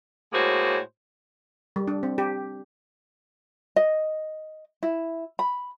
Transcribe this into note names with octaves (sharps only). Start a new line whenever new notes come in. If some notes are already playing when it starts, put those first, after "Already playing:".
A2 G#3 A#3 F#4 C5 C#5
G3
D4
C4
G4
D#5
E4
B5